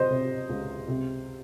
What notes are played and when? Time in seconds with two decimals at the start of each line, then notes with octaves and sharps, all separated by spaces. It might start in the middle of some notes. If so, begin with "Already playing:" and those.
Already playing: C3 F#3 C5 D#5
0.10 C3
0.49 C#2
0.88 C3